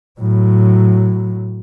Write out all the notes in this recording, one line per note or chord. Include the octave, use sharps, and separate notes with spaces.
A2 F#3